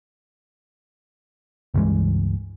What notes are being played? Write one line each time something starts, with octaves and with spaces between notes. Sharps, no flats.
C#2 G2 E3 G#3